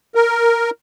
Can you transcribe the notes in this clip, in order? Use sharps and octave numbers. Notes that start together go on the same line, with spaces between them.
A#4